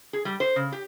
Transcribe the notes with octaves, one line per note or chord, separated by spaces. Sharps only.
G#4
G3
C5
C#3
G4